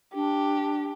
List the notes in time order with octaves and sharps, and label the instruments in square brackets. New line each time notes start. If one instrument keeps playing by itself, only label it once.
[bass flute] D4 [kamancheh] G4